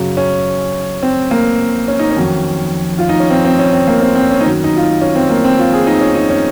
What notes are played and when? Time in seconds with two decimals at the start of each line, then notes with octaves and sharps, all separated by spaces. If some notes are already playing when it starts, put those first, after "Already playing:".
Already playing: F#2 C#3 F#3
0.17 C#4
1.03 C4
1.31 A#3
1.88 C#4
1.99 D#4
2.11 C#4
2.17 F2 D#3 F#3
2.98 F4
3.09 D#4
3.20 C#4
3.30 C4
3.45 C4
3.59 C#4
3.73 C4
3.87 A#3
4.02 C4
4.15 C4
4.30 C#4
4.40 D#4
4.44 F#2 D#3 F#3 C#4
4.64 D#4
4.76 F4
4.82 D#4
5.01 C#4
5.16 C4
5.30 A#3
5.44 C4
5.59 F4
5.73 G#4
5.87 D#4
6.01 C#4
6.15 D#4
6.29 C#4